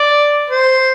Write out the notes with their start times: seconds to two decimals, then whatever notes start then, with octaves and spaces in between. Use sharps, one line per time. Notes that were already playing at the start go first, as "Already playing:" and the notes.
Already playing: D5
0.50 C5